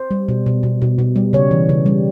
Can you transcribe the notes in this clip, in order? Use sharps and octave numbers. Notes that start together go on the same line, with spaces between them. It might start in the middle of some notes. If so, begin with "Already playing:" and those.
Already playing: C5
G3
B2
B2
B2
B2
B2
G3
C#3 C#5
E3
C#3
G3